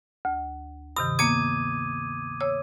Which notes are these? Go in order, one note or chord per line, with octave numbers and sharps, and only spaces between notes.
D2
G2 C3 D#3 D#6
A#3 B3 D6 G#6 D#7
C#5 E6